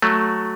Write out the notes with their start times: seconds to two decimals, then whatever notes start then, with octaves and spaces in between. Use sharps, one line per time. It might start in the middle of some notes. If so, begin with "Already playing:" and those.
0.02 F#3 A3